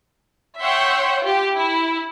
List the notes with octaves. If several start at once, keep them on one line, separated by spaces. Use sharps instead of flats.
C#5 E5 F#5 G5 C6 G6
F4 G4
E4